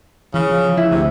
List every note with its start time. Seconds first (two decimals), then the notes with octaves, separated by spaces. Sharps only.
0.34 C#3 E3
0.49 F3
0.77 E4
0.91 D2 C3